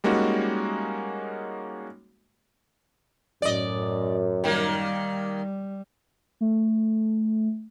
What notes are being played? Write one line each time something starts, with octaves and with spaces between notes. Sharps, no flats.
G3 G#3 A#3 C#4 D#4 F#4
F#2 A2 D5 D#5
D#3 G3 A#3
A3